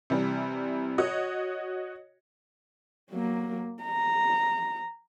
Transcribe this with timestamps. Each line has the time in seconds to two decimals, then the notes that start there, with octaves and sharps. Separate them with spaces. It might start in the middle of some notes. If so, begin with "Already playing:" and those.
0.10 C3 E3 G3
0.98 F#4 C#5 D#5
3.11 F#3 A#3
3.83 A#5